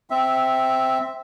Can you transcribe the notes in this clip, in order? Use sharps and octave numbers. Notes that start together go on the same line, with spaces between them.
C4 E5